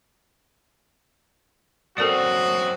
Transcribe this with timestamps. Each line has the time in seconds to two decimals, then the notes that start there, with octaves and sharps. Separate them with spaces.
1.98 F#2 C4 F#4 A4 A#4 D5 F#5 D#6